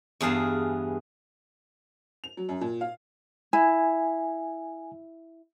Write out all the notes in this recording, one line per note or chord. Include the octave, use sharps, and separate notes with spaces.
E2 G2 G#4 F5 A5
F7
F#3
F#2
A#2
F5
E4 G#5